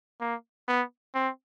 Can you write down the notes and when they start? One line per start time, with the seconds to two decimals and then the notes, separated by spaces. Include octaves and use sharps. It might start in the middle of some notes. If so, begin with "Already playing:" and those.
0.21 A#3
0.68 B3
1.15 C4